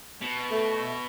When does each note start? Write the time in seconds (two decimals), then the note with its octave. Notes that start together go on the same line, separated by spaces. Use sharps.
0.22 B2
0.51 A3